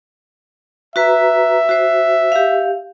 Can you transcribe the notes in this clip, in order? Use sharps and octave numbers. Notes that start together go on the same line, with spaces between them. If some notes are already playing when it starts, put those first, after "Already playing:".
F#4 B4 E5 A#5
F#4 C5
G4 F5